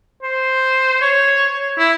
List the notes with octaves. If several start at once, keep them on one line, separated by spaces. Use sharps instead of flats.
C5
C#5
E4